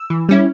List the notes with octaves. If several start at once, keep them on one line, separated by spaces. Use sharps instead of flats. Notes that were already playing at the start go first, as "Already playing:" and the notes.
Already playing: E6
E3
G3 C#4 E4